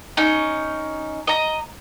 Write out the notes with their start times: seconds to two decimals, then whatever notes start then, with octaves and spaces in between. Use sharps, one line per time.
0.17 C#4 D#4
1.27 D#5 A#5